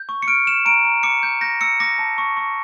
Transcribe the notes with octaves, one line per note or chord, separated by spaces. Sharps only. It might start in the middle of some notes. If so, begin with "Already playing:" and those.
Already playing: G6
C#6
C#7
F6 D7
F6 E7
A#5 D7
A#5
D6 C#7
G6
G6 A#6
E6 C#7
D6 A#6
A5
C#6
C#6